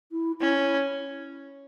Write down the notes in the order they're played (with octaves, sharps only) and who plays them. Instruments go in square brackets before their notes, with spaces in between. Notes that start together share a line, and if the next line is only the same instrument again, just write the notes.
[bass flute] E4
[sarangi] C#4 [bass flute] E4